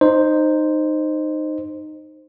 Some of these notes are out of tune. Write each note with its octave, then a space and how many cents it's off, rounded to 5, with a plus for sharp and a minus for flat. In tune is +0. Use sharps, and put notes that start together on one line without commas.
D#4 -15 C5 +0